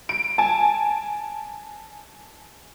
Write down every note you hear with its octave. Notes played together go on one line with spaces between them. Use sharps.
D7
G#5 A5